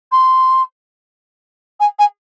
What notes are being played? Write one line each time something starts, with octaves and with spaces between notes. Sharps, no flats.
C6
G#5
G#5